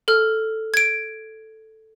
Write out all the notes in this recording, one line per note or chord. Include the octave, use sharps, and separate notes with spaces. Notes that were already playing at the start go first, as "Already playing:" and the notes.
A4 F6
G#6 D7